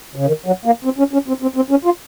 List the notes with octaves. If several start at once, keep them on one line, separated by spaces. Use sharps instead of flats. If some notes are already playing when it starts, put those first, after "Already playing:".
C#3
D#3
F#3
A#3
C4
C#4
C#4
C4
C4
C4
C#4
F4